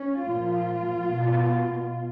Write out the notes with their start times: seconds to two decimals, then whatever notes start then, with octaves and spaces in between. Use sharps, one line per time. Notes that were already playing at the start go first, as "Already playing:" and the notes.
Already playing: C#4
0.24 A#2 F3 F4
1.08 B2